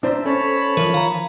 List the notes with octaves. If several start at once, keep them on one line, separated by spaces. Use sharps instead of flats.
D4 C5 E5 A5 A#5
C#4 A4 C5 C#5 A5 B5
E3 F3 A#4
D#3 F5 A#5